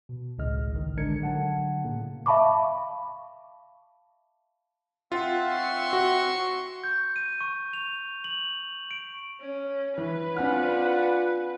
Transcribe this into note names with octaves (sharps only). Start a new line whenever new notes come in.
B2
G#1 C#2 A2 C#3 D#5 F6
A1 D#3
D3 G#3 D4 A#4 G#6 C#7
D3 F#3 F#5 A5
A2 C#3 A#3
E5 F5 A5 B5 C#6 D6
C4 F4 E5 F#5
C6 C#6
F#4
G6
D#7
C#6
F7
F#7
D7
C#4
E3 B4
C4 D4 F4 F#5 G#5 F6